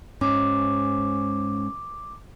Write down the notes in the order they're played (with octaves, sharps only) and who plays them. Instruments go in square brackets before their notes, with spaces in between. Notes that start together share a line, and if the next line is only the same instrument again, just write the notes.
[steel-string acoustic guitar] G#2 C#4 [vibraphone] D6